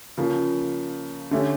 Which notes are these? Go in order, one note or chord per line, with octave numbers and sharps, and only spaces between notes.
C#3 F3 A#3
D3 A3 C#4 G4